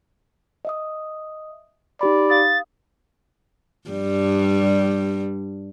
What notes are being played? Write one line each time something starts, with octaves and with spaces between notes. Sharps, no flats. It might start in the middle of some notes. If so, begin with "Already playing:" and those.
D#5 E5 D#6
D#4 G4 D5 B5
F5 D#6 A6
G2 G3